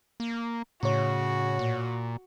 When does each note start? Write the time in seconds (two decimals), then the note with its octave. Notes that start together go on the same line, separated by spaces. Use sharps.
0.20 A#3
0.83 A2 C#3 F#4 C#5
1.59 A#2